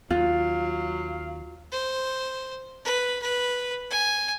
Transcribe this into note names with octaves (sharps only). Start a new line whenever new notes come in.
D#2 F#3 F4 F5
C5
B4
B4
G#5